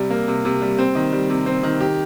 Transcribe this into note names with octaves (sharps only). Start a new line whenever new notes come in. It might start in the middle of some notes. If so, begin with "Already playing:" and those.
Already playing: C3 G3
A#3
C3
C3
G3
C4
D#3
G3
C3
C4
D#3
G4